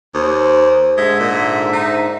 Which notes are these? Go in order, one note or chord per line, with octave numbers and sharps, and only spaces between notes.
D#2 C5
G#2 D3 G#3 E5
A#2
D#4